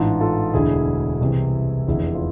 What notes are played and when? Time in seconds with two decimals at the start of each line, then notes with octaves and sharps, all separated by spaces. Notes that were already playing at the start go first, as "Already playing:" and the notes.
Already playing: A1 G#2 E3 D4 F4
0.20 F4 A4
0.53 E1 D2 D3 E4 G#4
1.21 C2 C3 E3
1.87 F1 E2 D3 E4 G#4
2.14 F4